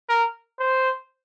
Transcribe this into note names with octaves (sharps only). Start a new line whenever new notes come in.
A#4
C5